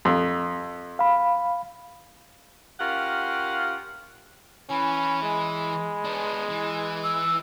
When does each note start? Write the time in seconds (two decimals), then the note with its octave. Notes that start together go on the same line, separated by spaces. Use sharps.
0.05 F2
0.99 F5 B5
2.79 C#4 F4 G4 A#4 F5 F#5
4.70 E3 C#4 G#5 B5
5.23 G#3
6.05 B3 D4
6.49 E3
7.04 E6